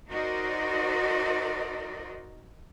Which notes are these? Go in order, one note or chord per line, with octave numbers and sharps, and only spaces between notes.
D#4 F#4 A#4 C5 D5 D#5